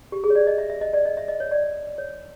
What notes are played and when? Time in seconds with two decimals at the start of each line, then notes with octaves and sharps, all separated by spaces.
0.12 G4
0.24 G#4
0.30 C#5
0.35 D5
0.47 D#5
0.58 E5
0.70 E5
0.81 D#5
0.93 D5
1.05 D#5
1.17 E5
1.28 D#5
1.40 C#5
1.51 D5
1.98 C#5